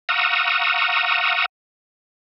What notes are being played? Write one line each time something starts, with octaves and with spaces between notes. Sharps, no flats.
F5 F#5 A#5 C#6 D#6 E6